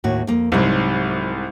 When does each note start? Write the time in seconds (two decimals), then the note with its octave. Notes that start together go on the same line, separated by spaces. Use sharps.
0.04 D#2 A2 F#4
0.27 F2 A#3
0.52 C2 G#2 F#3 G3